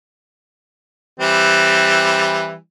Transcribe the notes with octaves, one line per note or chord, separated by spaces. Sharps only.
E3 G3 C4